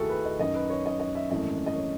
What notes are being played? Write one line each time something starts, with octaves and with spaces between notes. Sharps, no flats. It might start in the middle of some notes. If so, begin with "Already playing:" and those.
Already playing: D#2 D#3 A3 E4 F#4 G#4 A4
B4
D#5
F#2 D#3 F#3 D#5
B4
C#5
D#5
D#5
E5
G#1 F#2 E3 A3 D#5
D#5
C#5